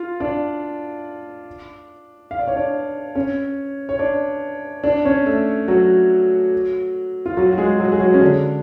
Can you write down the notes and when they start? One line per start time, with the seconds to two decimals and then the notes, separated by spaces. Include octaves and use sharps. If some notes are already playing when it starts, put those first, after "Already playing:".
Already playing: F4 F5
0.20 D4 D5
2.31 F5
2.39 D5
2.48 C#5
2.56 D4 D5
3.15 C#4 C#5
3.89 C#5
3.99 D4 D5
4.84 D4 D5
5.05 C#4 C#5
5.26 A3 A4
5.68 F#3 F#4
7.26 F4
7.37 F#3 F#4
7.52 F#4
7.58 G#3 G#4
7.79 F#3 F#4
7.92 G#4
8.00 F#3 F#4
8.14 C#4
8.21 D3 D4